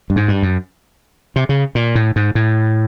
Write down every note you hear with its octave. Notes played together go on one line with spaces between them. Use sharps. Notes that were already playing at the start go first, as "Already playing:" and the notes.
G2
G#2
G2
F#2
C3
C#3
A#2
A2
G#2
A2